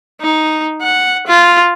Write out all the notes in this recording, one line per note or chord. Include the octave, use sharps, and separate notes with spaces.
D#4
F#5
F4